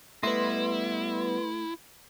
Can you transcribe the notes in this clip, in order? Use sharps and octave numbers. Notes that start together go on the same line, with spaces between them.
G3 A3 B3 E4 B4 D#5 C6